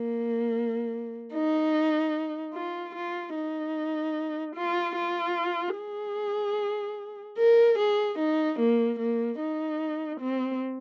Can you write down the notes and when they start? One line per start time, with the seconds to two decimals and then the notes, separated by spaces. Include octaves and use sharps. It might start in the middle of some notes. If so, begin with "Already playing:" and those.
Already playing: A#3
1.33 D#4
2.54 F4
2.95 F4
3.35 D#4
4.55 F4
4.96 F4
5.77 G#4
7.38 A#4
7.78 G#4
8.18 D#4
8.59 A#3
8.99 A#3
9.40 D#4
10.20 C4